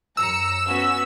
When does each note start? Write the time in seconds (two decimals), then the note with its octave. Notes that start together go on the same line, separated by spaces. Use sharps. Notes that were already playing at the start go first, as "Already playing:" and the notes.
0.17 F#2 A#5 E6 C#7
0.66 B3 C#4 F#4